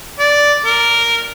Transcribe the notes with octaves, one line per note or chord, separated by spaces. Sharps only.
D5
A#4